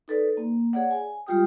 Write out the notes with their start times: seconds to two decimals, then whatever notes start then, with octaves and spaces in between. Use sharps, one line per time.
0.08 D#4 A4 B4 D5
0.37 A#3
0.73 G#4 C#5 D5 F#5
0.91 G#5
1.27 G3 G#3 F4 G4 G5 D#6